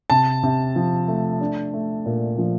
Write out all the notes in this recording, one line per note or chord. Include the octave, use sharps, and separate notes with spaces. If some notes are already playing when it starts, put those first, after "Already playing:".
C3 A5
C3
F3
A3
D4
A3
A#2
F3